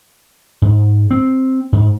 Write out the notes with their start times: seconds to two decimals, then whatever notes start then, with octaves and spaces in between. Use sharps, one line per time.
0.62 G#2
1.11 C4
1.73 G#2